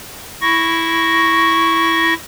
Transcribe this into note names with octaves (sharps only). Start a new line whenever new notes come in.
E4 C#6 A#6